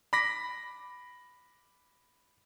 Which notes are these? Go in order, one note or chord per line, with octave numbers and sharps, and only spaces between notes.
B5 D6 A#6 B6